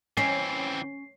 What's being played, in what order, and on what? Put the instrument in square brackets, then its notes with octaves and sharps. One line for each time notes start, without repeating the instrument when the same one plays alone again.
[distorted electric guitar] E3 C4 [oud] C#4 [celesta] C7